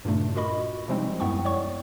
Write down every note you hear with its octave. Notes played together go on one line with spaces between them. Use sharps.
G2 A#2 C#3 A3 D4
F4 F#4 A#4 D#5 B5 C#6
C3 F3 G3 G#3 C4 D#4
F#2 B3 E4 G5 C#6
C#5 D5 C#6